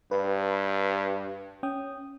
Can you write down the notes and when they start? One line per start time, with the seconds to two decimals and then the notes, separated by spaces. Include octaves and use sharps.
0.11 G2 B4
1.63 C#4 G5 D#6